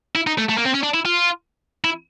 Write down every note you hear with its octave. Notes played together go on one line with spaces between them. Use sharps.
E4
D#4
A3
A3
A#3
C4
C#4
D4
E4
F4
E4